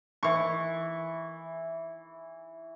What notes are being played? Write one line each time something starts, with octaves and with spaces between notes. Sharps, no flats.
E3 C#6